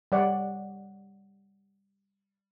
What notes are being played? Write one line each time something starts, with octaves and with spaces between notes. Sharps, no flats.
G3 C#5 D5 F#5